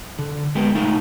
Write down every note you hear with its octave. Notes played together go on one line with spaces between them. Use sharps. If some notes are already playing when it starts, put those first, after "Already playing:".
D3
G#3 B3 G4 A#4
A3 D#4 F4 G#4 A#4